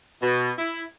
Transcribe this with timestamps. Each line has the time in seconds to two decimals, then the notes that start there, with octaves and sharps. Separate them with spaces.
0.22 B2
0.58 E4